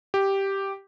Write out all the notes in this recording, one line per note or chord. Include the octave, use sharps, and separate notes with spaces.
G4